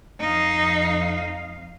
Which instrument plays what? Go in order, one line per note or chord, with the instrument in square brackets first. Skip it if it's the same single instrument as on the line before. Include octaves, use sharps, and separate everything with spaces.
[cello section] F2 F5 [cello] D#4